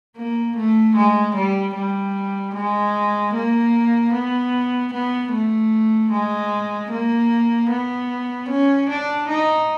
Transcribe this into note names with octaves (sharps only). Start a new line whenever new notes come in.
A#3
A3
G#3
G3
G3
G#3
A#3
B3
B3
A3
G#3
A#3
B3
C#4
D4
D#4